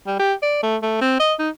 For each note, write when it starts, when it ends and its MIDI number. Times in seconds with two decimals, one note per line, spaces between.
0.06 0.18 55
0.19 0.33 67
0.42 0.59 74
0.63 0.77 57
0.82 0.96 57
1.01 1.20 60
1.20 1.33 75
1.39 1.49 63